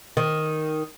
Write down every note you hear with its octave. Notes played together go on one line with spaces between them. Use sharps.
D#3